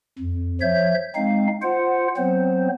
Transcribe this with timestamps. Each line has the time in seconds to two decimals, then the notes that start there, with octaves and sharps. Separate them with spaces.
0.19 F2
0.61 F3 C#5 E5 G6
1.16 G#3 C4 D#4 F5
1.62 F4 C5 F#5
2.17 F#3 B3 C4 C5